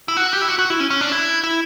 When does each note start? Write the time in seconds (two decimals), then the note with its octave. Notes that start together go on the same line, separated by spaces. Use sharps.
0.08 E4
0.17 F#4
0.33 G4
0.41 E4
0.49 F#4
0.59 F#4
0.70 E4
0.80 C#4
0.90 C#4
1.01 D4
1.12 E4
1.44 E4